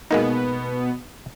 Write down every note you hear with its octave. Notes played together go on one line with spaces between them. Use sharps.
B2 G#3 A#3 B3 D#4